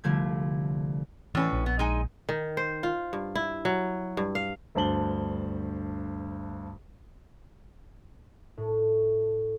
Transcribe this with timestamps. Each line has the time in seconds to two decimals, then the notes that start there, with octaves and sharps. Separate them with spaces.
0.04 C2 D3 F3 A3 G#6
1.35 A2 E3 C#4 B4
1.53 A#1
1.66 B3
1.79 G#3 D#4 G#5
2.29 D#3
2.57 C5
2.83 F4
3.13 G2
3.35 E4
3.65 F#3
4.17 G2
4.35 F5
4.75 D2 G2 C5 A5 F#7 G7
8.57 A2